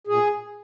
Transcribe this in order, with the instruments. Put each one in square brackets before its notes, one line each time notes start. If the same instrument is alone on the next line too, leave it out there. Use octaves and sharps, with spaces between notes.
[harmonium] A#2 G#4